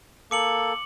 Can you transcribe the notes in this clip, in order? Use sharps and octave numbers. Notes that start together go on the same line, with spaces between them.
A#3 A4 D6 C#7 F#7